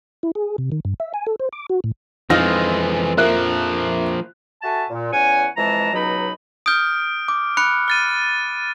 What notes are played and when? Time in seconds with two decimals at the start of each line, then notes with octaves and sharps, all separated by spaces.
0.23 E4
0.35 G#4
0.58 C3
0.72 D#3
0.85 G2
1.00 E5
1.14 G#5
1.27 A4
1.40 C5
1.53 D6
1.70 F#4
1.84 A2
2.30 F2 E3 G#3 C4 D#4 F4 A#6
3.17 F3 A#3 A#4 E5 F#6
4.63 F#4 A4 E5 G#5 A5
4.90 A#2
5.11 E2 C#4 F#5 G#5
5.57 F2 E3 G#3 E5 A5 A#5
5.93 C#2 B2 F#3 D#4 D#5 B5
6.66 D#6 F6 G6 D7
7.28 D6
7.57 B5 F#6 C#7
7.88 F6 A6 D#7